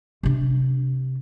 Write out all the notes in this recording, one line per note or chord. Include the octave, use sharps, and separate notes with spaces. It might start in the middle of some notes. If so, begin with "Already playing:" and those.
C3 D4